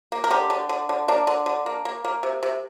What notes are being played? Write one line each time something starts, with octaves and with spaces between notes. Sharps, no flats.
A#3
A#4
D3 G4
D3
D3
D3
A#3 D4
D3
D3
A#3
A#3
A#3
C3
C3